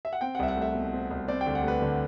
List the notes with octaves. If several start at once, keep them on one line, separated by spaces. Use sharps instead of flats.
E5
F#5
C4 G5
F#5
C2 E5
F#5
A3 E5
B2
C4
C2
C4 D5
G5
D2
F#5
A3 B4
D3